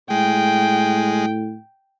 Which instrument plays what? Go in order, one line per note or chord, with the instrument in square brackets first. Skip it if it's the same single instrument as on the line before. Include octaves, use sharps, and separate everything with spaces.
[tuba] A2 [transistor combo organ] G#3 [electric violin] G5